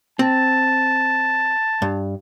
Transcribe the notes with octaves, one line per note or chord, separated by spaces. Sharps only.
C4 A5
G2